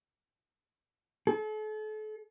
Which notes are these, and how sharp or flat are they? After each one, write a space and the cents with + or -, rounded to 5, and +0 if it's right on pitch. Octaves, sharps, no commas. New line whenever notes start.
A4 -40